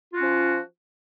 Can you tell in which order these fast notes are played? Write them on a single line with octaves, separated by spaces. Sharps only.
F4 F#4 C#4 F3